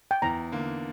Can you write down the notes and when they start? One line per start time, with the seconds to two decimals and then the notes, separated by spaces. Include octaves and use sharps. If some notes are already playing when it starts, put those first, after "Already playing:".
0.11 G5
0.22 E2 A#5
0.52 D3 A#3